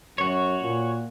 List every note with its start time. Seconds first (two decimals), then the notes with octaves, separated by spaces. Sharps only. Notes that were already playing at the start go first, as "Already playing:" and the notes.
0.18 F#2 F#4 C#5
0.62 A#2